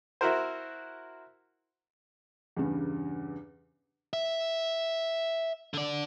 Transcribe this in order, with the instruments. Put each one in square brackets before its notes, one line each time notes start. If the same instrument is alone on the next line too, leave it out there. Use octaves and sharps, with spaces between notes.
[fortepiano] E4 F#4 A#4 C5
[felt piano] E2 G2 C#3
[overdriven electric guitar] E5
D3 D5